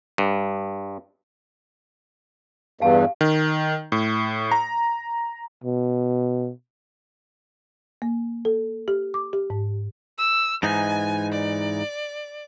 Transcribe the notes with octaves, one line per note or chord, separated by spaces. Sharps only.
G2
E2 G2 G4 F5 A5
D#3
A2
A#5
B2
A#3
A4
G4
D6
G4
G#2
E6
G#2 E3 D#4 G#5
D5